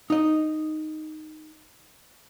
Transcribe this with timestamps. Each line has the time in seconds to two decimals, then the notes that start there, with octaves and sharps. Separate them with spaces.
0.10 D#4 D#5